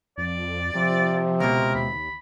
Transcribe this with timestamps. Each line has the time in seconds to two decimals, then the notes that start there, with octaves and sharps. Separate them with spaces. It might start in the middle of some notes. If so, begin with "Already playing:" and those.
0.18 F2 D5
0.75 C3 F3
1.40 C#2 B2 A#4
1.75 D#2 B5